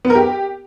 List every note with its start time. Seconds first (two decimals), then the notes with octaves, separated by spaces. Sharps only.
0.05 B3
0.10 A#4
0.15 G4